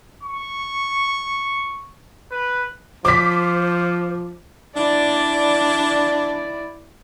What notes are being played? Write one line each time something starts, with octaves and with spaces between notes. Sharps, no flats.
C#6
B4
F3 C5 D6 B6
D4 E4 D5